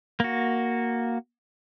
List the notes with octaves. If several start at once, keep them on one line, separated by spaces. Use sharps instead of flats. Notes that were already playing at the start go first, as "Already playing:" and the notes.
A#3 F#4